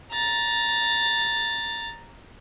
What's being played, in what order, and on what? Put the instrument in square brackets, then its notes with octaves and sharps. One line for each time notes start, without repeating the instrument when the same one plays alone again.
[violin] A#5 A6